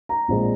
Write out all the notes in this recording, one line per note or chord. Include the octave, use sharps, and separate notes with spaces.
A#5
A#1 A#2 G#3 C4